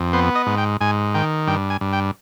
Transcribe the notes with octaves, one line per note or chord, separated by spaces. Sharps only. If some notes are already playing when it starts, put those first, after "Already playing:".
Already playing: F2
B3 C5
D#5
G#2
G5
G#2 G#5
D#3 G5
G2 G5
G#5
G2
G5